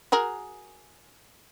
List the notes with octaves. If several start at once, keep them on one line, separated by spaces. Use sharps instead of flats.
F#4 G#4 A#4